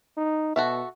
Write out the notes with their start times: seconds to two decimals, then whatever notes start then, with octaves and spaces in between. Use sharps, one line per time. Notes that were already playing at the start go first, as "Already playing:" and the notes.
0.17 D#4
0.56 B2 F#4 A4 E5